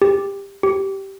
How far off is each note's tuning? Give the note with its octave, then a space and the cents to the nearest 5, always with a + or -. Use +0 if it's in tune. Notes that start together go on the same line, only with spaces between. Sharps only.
G4 +20
G4 -10